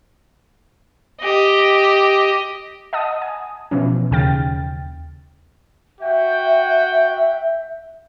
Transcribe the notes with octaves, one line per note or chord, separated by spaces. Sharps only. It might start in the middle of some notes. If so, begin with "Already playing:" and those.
G4 D#5
D#5 F#5 A5 D#6
G#5
B2 E3 F3 C#4
D#2 C#3 G5 F6 A6
F#4 E5 G5